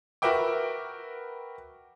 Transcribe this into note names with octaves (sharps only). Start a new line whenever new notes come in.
F#4 A#4 B4 E5 G5 D6